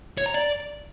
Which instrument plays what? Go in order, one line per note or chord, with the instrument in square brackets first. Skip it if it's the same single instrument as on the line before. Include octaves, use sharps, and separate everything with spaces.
[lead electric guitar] C#5
A#5
D5